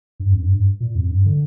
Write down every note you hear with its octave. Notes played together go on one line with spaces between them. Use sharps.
G2
F2
G2
G2
A#2
F2
G2
D3